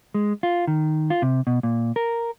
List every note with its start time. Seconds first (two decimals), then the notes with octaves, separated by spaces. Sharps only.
0.15 G#3
0.43 F4
0.67 D#3
1.10 F4
1.22 C3
1.47 B2
1.63 A#2
1.96 A#4